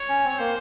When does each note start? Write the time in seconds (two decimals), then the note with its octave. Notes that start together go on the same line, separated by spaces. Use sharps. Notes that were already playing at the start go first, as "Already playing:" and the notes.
Already playing: C#5
0.09 C#4
0.25 C4 C#5
0.39 A#3 C5